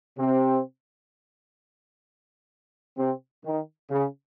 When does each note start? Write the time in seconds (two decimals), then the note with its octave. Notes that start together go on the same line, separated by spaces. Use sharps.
0.18 C3 C4
2.97 C3 C4
3.45 D#3
3.90 C#3